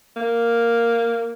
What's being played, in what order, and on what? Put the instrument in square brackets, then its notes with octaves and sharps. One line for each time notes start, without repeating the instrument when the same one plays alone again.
[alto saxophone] A#3